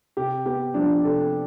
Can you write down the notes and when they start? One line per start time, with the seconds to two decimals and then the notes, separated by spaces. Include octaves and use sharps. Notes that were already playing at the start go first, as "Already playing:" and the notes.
0.17 C3 G4
0.45 B3 G4
0.74 F3 D4
1.04 C3 A4